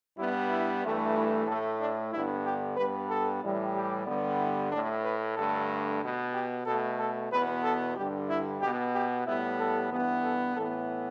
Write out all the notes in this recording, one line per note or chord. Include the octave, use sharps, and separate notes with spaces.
G2 G3 B3 E4
E4
G2 E3 A3
E4
A2 A3 A4
D4
G2 D3 B3 E4
G4
G2 G3 B3 B4
A4
A2 E3 G3
G4
G2 D3 G3 B3
E4
A2 A3 D4
B4
G2 D3 A3 A4
B2 B3
G4
B2 A3 A4
A4
E2 B2 B3 B4
A4
G2 D3 G3 G4
E4
B2 B3 G4
G4
A2 G3 B3 E4
A4
G2 E3 B3
A4
A2 E3 B3 A4